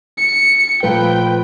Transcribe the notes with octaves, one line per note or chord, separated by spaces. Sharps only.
C#7
A#2 F3 A3 B4 G5